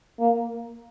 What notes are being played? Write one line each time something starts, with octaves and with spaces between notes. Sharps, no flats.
A#3